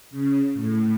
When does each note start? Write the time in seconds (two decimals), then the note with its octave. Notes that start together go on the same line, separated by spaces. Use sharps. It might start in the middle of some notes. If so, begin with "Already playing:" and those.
0.11 C#3
0.54 A2